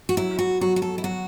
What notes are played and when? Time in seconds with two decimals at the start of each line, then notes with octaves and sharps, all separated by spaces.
0.09 F#4
0.17 F#3 E4
0.39 F#4
0.61 F#3 F#4
0.76 F#4
0.82 A4
0.98 E4
1.04 F#3 F#4